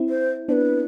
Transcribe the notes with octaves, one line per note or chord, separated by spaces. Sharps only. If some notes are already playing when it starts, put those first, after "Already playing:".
Already playing: C4 E4
C5
B3 D4 B4 C5